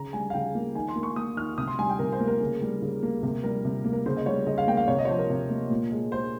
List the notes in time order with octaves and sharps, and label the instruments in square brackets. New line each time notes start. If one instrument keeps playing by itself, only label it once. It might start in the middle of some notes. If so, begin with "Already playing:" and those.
Already playing: [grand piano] C#3 A#5
G3 G#5
F5
C#3 G5
A#3
D#3 G#5
C6
A#3
C#6
A#3 D#6
D#3 F6
C3 D#6
C6
G3 G#5
G5
C3 A#4
C5
A#3
A#4
C#3
G3
C#3
A#3
C3 A#4
G3 A#4
C3
A#3
A#4
C#3 C5
D#5
G3 C#5
C#3 D#5
F5
A#3 G5
F5
C3 C#5
D#5
C#5
F3 C5
A#4
C3
A#3
A#2
G#3
G#3 C5